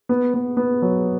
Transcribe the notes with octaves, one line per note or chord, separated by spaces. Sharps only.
B3
B3
B3
F#3